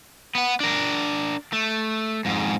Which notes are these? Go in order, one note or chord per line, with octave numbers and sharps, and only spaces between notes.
B3 F#5
D4 A#4
A3
F2 G#2